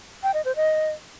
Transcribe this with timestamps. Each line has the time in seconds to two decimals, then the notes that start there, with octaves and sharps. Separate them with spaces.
0.23 G5
0.34 D#5
0.45 C5
0.56 D#5